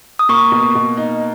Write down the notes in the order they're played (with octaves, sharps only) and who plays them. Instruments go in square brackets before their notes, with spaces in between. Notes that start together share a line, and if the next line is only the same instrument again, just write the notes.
[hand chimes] D#6
[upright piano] A#3 [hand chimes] C#6
[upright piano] B2
B2
D#4